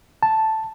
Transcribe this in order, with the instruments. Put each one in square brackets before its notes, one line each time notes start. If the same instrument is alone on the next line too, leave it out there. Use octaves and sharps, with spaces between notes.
[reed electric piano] A5